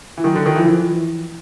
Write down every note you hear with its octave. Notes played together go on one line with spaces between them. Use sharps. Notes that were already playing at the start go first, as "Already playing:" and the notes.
E3
D#3 F#3
D3
D#3
E3 F3
E3
E3